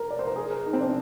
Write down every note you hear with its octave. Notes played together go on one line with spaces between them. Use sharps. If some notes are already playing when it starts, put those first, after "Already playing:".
Already playing: A#4
D5
C5
A#4
G#4
A#4
D#4
C4
D4